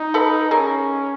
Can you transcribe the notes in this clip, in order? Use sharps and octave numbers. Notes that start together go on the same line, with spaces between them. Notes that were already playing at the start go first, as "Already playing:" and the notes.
Already playing: D#4
A4 B4
C#4 G#4 A#4